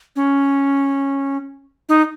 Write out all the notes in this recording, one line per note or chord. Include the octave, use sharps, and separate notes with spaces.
C#4
D#4